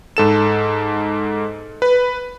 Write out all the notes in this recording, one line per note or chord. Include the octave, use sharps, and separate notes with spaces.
G#2 A4 E7
B4